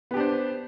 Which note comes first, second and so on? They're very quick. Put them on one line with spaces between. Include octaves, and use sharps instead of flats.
B3 G4 D4 C5